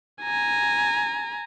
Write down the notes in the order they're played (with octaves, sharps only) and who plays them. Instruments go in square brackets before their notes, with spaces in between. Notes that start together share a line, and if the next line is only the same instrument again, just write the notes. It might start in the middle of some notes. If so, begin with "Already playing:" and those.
[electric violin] G#5 A#5